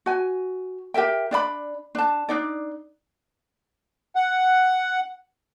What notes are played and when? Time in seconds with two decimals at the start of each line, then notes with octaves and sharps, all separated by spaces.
0.06 F#4 G#5
0.94 G4 A#4 E5 G5
1.31 D4 D5 E5 B5
1.95 D4 A5
2.29 D4 D#4 D5
4.16 F#5